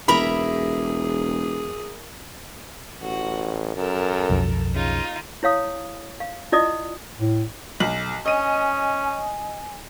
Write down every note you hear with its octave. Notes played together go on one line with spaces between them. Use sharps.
E1 G#4 A#4 E5 A#5 B5
A1 F#4
F#2 A4 A#4
B1 F2
C#3 D#4 F4
E4 C#5 F5 D#6
F5
E4 F4 D5 D#5 D#6
A2
B1 F#7
C#4 D#5 G#5 D#7